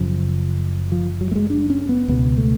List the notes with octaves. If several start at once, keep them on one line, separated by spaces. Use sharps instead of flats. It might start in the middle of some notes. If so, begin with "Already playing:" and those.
Already playing: F#1 F#2 C#3 F3
F3
F#3
A3
G#3
D4
C#4
B3
C#2 B2 B3
A3